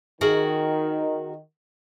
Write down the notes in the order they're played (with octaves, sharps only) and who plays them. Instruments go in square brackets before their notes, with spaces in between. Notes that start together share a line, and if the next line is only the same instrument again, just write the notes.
[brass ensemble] D#3 [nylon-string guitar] F#4 G#4 A#4